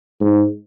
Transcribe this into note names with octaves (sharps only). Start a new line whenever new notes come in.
G#2